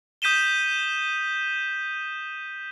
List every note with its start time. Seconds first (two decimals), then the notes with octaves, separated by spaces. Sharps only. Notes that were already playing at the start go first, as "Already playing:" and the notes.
0.22 D#6 G6 B6 D#7 E7 G7